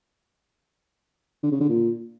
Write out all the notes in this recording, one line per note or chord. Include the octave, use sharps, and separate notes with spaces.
D3
C#3
D3
A#2